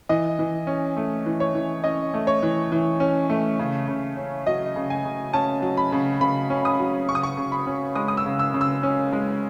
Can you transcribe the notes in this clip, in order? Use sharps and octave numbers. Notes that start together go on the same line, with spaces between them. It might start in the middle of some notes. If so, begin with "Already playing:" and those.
E3 D#5
E3
C#4
A3
E3
C#5
E3
C#4 D#5
A3
C#5
E3
E3
C#4
A3
C#3
C#3
C#4
F#3 D#5
C#3
G#5
C#3
C#4 A5
F#3
B5
C#3
C#3 B5
C#4
D#6
F#3
C#3 C#6
D#6
C#6
C#3
B5
C#4
G#3 D#6
D#6
E6
C#3
E6
C#3
E6
C#4
G#3